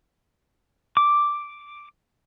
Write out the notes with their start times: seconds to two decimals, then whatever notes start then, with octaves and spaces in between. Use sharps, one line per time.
0.97 D6